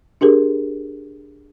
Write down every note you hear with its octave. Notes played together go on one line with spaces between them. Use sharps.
D4 G4 G#4 A#4